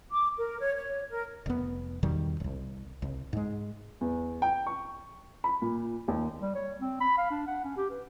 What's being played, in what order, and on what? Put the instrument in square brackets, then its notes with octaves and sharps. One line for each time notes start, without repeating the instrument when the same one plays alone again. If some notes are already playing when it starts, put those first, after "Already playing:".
[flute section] D6
A#4
C#5
C#5
A#4
[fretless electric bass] F1 B3
E2 B2 D#3 G3
E1 C2
C2
G#2 G#3
[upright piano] E2
G5
C#6
B5
A#2
D#2
[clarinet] G3
C#5
C4
B5
F5
D4
F#5
C#4
G4
B4